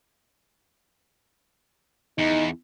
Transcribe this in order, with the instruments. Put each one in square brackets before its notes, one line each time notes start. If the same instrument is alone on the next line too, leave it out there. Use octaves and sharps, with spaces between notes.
[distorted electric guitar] E2 [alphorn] D#4